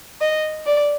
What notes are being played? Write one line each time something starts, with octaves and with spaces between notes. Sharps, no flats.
D#5
D5